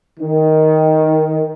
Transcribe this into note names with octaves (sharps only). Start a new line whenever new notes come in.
D#3